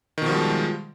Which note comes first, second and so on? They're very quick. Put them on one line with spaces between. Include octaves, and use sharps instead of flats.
D#3 B2 F3 G3 G#3